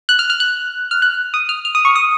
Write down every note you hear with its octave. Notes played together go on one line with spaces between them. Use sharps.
F#6
F6
F6
F#6
F6
F#6
D#6
F6
F6
D#6
C#6
D#6